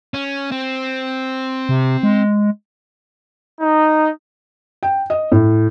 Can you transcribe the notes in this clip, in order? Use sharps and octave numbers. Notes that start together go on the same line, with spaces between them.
C#4
C4
C3
G#3
D#4
G5
D#5
A2